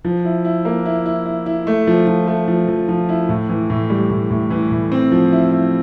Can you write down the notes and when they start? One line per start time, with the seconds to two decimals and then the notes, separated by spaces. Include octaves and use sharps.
0.04 F3
0.25 E4
0.45 E4
0.65 A#3
0.85 E4
1.06 E4
1.25 E4
1.46 E4
1.67 A3
1.87 F3
2.07 F3
2.27 A3
2.48 F3
2.68 F3
2.88 F3
3.09 E4
3.29 A2
3.49 E3
3.70 A2
3.90 G3
4.10 A2
4.30 A2
4.50 E3
4.71 A2
4.92 C4
5.12 F3
5.32 E4
5.52 E4